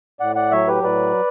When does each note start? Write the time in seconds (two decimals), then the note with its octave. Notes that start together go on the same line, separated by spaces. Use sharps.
0.20 A2 D5 F#5
0.35 D5 F#5
0.51 F#3 C#5 E5
0.67 G4 B4
0.83 A2 B4 D5